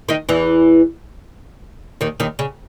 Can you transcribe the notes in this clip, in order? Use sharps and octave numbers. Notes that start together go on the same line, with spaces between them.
D#3 D#4
E2 E3
D#2 D#3
D#2 D#3
C#3